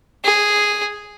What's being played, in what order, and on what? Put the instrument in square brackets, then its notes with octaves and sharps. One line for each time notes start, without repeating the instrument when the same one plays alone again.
[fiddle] G#4